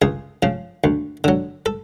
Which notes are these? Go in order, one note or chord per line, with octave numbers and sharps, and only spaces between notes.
C#2 G#4
C#3 F3
D2
D3 F#3
A4